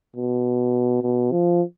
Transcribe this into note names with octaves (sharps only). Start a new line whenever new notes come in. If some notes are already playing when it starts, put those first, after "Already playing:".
B2
B2
F3